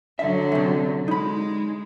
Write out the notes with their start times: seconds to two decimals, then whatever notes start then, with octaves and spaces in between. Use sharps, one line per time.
0.19 D3 F#3 E5
0.52 F#2 C3
1.08 G#3 D#4 B5